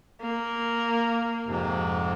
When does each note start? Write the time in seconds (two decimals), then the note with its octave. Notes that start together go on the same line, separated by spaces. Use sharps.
0.21 A#3
1.46 F2 G#2 C3